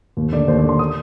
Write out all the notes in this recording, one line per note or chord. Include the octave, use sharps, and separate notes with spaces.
D#2
D3 D5
D#2 C5
D5
D3
C6
D#6